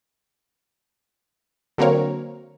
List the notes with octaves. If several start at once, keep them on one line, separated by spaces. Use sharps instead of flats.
D3 F#3 A#3 C4 A#4 C#5